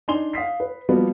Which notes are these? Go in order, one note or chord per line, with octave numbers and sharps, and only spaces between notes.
D4 D#4 G#5 C6 F7 G7
F5 D#6 B6 C7
B4
F3 G3 A#3 B3 F#4